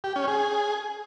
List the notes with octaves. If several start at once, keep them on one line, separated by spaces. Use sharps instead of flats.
G4
C#4
G#4